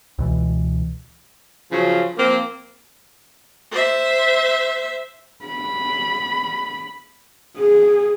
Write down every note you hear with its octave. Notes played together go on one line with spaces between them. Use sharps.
C#2 B2 E3
C#3 F3 F#3
F3 A#3 C4
C5 E5
B5
G#4